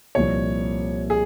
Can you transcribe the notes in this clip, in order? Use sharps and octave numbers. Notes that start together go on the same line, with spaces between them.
C2 A#2 F3 C#5
G#4